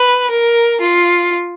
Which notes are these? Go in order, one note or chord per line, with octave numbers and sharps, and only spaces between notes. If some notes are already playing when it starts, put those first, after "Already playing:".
Already playing: B4
A#4
F4